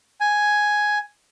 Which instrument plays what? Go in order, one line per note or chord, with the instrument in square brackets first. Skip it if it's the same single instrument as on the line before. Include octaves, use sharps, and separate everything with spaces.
[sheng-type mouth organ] G#5